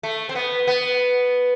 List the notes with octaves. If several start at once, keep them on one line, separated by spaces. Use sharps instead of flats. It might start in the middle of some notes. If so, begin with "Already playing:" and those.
A3
C4
B3
B3